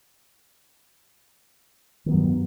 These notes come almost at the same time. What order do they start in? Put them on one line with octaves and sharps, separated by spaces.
D#3 B3 F#3 G2